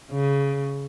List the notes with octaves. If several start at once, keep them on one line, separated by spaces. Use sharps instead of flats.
C#3